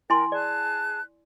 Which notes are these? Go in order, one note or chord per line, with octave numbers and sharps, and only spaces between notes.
E4 A#4 G5 G#5 C6
G#4 D5 A5 F#6